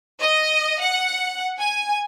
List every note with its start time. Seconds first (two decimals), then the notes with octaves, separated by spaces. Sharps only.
0.21 D#5
0.81 F#5
1.60 G#5